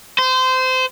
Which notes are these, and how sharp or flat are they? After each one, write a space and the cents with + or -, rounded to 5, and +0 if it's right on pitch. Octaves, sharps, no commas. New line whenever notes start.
C5 -25